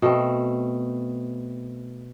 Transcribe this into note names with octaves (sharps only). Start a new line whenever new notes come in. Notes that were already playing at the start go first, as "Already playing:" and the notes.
B2 A3 C4